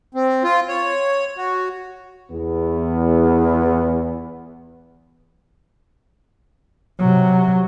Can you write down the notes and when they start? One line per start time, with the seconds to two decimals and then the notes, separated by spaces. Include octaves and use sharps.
0.15 C4
0.44 F4
0.68 C#5
1.37 F#4
2.31 E2 B3
6.99 C3 F#3